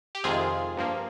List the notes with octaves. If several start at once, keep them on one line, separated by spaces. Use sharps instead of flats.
G4
F2 C3 D#3 G#3 C4 F4 G#4
G2 F3 A#3